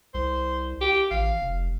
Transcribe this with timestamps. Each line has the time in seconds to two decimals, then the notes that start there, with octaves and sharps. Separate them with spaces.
0.14 C2 C5
0.81 G4
1.11 A1 F5
1.41 F1